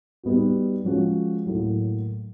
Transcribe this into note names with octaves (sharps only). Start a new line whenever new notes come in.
G3 B3 D#4 F#4
F3 G#3 C#4 F#4
A2 F#3 A#3